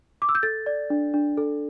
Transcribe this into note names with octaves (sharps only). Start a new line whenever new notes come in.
D6
E6
G6
A4 A6
D5
D4
D4
A4